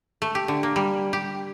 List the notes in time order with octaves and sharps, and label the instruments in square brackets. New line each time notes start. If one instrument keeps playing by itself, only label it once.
[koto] A3
G4
D3
A#3
G3
G4